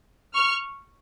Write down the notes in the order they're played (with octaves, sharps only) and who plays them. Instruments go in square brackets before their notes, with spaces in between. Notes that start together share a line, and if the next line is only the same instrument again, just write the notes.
[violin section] C#6 F6